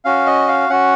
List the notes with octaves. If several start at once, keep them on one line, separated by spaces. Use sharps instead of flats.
C#4 F#4 F5
D#5
F5
C#4 F#4 F#5